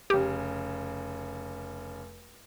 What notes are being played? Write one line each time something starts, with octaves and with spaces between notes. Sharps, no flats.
F1 C#3 G4